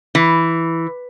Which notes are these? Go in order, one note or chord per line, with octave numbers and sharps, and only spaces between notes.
E3